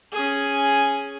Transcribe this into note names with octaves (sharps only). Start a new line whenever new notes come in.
C#4 G#4